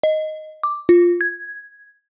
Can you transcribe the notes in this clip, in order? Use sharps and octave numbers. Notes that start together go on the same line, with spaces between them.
D#5
D6
F4
G#6